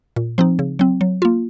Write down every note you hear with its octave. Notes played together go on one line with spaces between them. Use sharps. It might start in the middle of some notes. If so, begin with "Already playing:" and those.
A#2
F3 C4 D#4
C#3
F#3 C4
F#3
A#3 F4